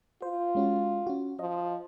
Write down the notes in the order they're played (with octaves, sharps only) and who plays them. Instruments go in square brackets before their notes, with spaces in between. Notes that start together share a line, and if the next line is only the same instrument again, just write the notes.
[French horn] F4 [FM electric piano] C5
[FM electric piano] G#3 C#4 F#4
C#4 F#4
[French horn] F3 [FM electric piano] D#5